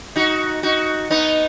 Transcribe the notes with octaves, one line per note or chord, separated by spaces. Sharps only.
D#4 F#4
D#4 F#4
B3 D#4